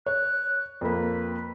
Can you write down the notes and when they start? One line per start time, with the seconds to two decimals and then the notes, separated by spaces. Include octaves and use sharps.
0.06 C#5 F#6
0.81 F2 A#3 B4